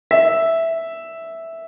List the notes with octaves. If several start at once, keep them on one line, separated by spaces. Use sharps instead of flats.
E5